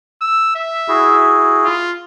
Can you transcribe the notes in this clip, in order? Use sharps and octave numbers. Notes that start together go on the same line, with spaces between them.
E6
E5
E4 F#4 G#4
F4